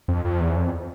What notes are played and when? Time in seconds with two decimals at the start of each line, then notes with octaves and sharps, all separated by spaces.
0.08 F2
0.25 F2
0.40 E2
0.56 F2